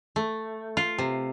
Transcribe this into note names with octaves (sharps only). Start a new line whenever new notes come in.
A3
F4
C3